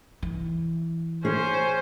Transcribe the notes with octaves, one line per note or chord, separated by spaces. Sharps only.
E3
C#4 G#4 C5